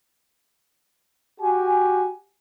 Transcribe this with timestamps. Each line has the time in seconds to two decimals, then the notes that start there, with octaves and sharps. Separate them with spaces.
1.40 F#4 G4 G#5